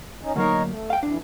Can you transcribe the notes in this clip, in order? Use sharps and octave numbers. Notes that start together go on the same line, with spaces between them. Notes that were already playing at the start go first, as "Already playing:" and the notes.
C#4 D#4
D2 F#3 A#3 D#4 A#4 C#5
A3
F5 G5
F2 E3 D4